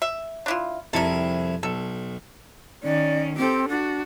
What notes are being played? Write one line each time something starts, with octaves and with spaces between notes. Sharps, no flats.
E5
D4 E4 F4
C2 F2 E4 A4 A#4
B1 A4
D#3 C#4 D5
C4 G4 A4
D4 F#4